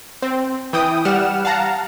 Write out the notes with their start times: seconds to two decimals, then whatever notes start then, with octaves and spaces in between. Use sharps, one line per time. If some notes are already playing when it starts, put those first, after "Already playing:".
0.22 C4
0.73 E3 G5 D#6
1.05 G3 F#5 F6 E7
1.45 F5 F#5 A5 A#5